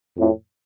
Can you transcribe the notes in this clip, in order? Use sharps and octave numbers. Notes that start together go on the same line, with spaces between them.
F2 A2